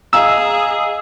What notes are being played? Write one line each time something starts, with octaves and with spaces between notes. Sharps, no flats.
G#4 D#5 F5 A#5 E6